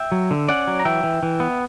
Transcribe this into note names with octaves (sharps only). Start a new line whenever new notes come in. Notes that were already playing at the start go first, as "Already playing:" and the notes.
Already playing: E5 G5
F#3
D3
C#4 D5 F#5
F#3
A#5
E3 E5 G5
E3
E3
B3